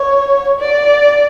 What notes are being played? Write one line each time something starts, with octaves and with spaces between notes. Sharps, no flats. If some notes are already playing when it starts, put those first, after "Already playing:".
Already playing: C#5
D5